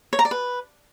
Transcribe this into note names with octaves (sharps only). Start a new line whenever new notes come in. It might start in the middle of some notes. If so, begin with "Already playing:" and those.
C#5
A#5
D5
B4